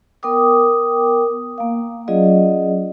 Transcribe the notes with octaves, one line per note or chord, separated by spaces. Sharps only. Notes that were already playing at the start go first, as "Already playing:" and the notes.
B3 A#4 G5 D6 D#6
A#3 F5
F#3 C#4 F4 G#4 D5 D#5